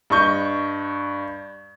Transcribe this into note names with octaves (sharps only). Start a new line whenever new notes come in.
G2 D#5 C#6 G6